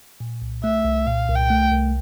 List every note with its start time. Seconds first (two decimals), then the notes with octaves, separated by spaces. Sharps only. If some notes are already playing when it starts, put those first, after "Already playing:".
0.20 A#2
0.42 C2
0.63 A3 E5
0.85 C2
1.07 A#2 F5
1.29 C2
1.35 G5
1.50 A3
1.72 C2